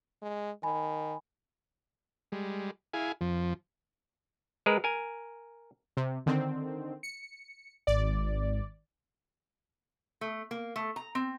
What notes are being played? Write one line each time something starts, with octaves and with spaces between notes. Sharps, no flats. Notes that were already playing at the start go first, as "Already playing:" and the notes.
G#3
D#3 G#5 B5
G3 G#3
E4 G#4 F5 G#5
F2 F3
G#3 G#4 A#4 B4
A#4 G#5
C3
D3 D#3 C4
C#7
G#1 D5
A3
A#3
A3
A#5
C4